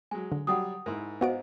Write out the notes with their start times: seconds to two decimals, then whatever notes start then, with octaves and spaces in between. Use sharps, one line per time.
0.11 F#3 G#3 G#5
0.32 D3
0.47 F#3 G3 F#5 G5 D#6
0.86 G#2 E4 A#4 C6
1.21 B3 F#4 C5 D#5 F5 D7